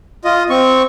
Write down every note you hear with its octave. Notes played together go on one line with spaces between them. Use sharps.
F4 D#5
C4 C#6